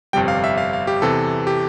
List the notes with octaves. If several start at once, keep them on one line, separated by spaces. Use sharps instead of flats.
G1 F2 C3 G3 G5
F5
E5
F5
F5
G4
E2 C3 E3 A4
G4